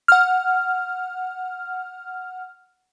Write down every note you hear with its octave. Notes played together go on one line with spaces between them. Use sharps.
F#5 F6